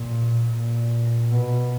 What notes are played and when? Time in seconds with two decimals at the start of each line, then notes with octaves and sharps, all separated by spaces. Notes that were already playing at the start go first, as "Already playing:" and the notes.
Already playing: A#2
0.50 A#2
1.31 B2